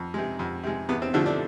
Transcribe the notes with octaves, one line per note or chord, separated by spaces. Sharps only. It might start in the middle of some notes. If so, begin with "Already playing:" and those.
Already playing: F2
C3 G#3
F2
C3 G#3
E2 B3
C4
D3 F3 A3 E4
D4